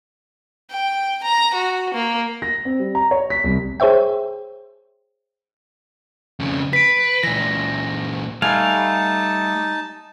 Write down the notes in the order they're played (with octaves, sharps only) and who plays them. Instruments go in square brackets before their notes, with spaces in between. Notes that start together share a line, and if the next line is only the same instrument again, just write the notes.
[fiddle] G5
A#5
F#4
A#3
[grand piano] A#6
C4
G3
A#5
C#5
B6
C2
[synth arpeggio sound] G#4 C5 C#5 E5 G5
[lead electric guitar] F2 C#3
[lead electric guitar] B4 [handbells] B6 D7
[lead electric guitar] A#2 E3 [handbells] A#6
[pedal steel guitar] G3 A3 F5 [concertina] D#4 A5 [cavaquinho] G#5